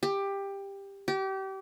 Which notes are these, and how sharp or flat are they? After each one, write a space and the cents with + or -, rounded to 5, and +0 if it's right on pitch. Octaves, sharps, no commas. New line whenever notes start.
G4 +15
G4 -30